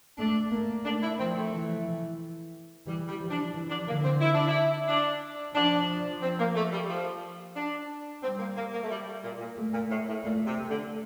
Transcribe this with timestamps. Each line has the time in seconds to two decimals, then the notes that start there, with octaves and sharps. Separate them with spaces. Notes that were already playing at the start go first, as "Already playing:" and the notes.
0.18 A3 D4
0.51 A#3
0.84 A3 D4
1.02 E4
1.19 F3 C4
1.35 A3
1.52 E3
2.86 E3 G3
3.08 G3
3.20 F3
3.31 D4
3.53 E3
3.70 D4
3.87 D3 A#3
4.04 C4
4.21 E4
4.34 D4
4.47 E4
4.88 D4
5.54 F3 D4
6.22 C4
6.39 A#3
6.55 A3
6.72 G3
6.89 F3
7.55 D4
8.23 G3 C4
8.39 A#3
8.56 A#3
8.73 A#3
8.83 A3
8.90 G3
9.23 A#2
9.40 A#2
9.57 A3
9.73 A#2
9.90 A2
10.07 A2
10.24 A#2 A3
10.46 C3
10.57 A3
10.69 D3